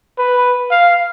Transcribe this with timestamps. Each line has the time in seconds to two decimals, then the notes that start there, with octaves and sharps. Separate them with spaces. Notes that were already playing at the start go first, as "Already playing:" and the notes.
0.19 B4
0.71 F5